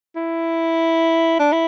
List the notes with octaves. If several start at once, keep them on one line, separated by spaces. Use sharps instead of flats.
E4
D4
E4